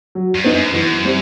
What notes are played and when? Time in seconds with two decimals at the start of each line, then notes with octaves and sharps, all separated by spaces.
0.15 F#3
0.35 G2
0.44 B3 D#4
0.54 F#2
0.74 F#2 E3
1.04 G3 C4